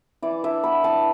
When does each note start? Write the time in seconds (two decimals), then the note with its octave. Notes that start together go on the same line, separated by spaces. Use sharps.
0.22 E3 D5
0.44 D4 E5
0.64 B3 B5
0.84 E3 A5